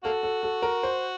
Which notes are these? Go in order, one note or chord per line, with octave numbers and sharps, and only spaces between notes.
A#3 F#4 A4
A4
A4
A#4
C5